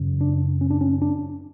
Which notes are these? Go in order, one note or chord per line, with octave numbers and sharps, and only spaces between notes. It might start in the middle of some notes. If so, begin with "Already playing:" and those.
Already playing: F#2 C#3
D4
C#4
D4
C#4
D4